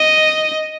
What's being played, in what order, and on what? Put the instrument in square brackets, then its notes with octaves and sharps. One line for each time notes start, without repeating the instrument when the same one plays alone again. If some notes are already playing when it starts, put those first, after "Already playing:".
Already playing: [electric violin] D#5